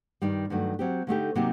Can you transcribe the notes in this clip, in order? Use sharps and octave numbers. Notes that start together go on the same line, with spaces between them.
G2 D#3 G3
G2 D#3 F#3 A3
F#3 C4 G4
D3 A3 D#4 G4
C3 F#3 A#3 D#4 G4